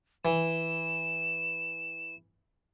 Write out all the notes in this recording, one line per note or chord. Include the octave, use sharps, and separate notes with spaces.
E3 E7